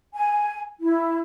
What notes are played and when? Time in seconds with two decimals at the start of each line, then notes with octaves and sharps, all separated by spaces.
0.14 G#5
0.81 E4